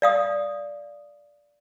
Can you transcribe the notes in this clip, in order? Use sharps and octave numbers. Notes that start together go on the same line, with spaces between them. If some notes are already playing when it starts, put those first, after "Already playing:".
D5 F5 D#6